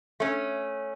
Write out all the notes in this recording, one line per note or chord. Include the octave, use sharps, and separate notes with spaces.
A3 C#4